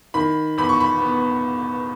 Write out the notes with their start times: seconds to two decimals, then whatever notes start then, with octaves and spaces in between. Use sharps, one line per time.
0.14 D#3 B5
0.58 E2 B5
0.69 C#6
0.80 B5
1.01 B3